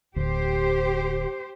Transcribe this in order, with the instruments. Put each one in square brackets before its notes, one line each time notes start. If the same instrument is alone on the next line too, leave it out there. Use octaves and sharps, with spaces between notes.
[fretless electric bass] D1 D2 [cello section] G4 C5